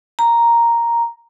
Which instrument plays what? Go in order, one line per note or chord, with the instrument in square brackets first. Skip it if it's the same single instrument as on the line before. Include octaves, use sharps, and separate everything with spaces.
[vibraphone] A#5